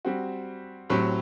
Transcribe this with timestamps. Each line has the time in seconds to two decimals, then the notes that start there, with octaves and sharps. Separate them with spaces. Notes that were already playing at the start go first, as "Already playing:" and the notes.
0.05 G3 C4 F#4
0.90 A2 F#3 C4 G4